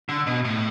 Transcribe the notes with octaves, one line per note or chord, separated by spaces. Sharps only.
D3
B2
A2